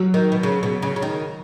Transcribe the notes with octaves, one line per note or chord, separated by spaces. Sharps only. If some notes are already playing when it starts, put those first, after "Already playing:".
Already playing: F#3
D#3
B2
C#3
B2
C#3
C#3
D#3